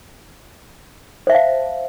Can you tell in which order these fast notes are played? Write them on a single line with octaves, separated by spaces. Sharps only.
C5 E5 A5 F5